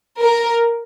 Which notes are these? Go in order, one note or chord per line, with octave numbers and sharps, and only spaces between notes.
A#4